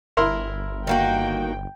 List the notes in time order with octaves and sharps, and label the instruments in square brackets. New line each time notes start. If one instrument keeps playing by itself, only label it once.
[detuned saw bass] G1 [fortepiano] E4 A#4 C6
[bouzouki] D#3 A#3 F#4 [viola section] G5